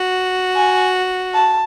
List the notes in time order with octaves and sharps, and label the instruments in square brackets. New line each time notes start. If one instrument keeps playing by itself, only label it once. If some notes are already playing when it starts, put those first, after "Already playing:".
Already playing: [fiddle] F#4
[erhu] G#5
A5